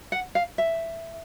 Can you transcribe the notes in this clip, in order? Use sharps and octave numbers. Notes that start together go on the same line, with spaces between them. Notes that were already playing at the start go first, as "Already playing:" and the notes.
F#5
F5
E5